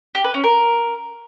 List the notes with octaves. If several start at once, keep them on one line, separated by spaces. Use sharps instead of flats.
G4
B4
C#4
A#4